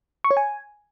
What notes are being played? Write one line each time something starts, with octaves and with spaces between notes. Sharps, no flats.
C#6
C#5
G#5